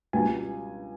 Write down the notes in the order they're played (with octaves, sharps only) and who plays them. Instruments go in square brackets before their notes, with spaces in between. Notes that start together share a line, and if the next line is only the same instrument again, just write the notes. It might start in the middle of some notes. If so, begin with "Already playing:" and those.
[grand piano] C#2 B2 G3 G#5